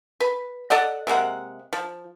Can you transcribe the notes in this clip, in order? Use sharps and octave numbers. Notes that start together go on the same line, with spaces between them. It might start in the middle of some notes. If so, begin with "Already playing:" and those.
B4
A4 D5 D#5 F#5
C3 G#3 A#3 F#5
F3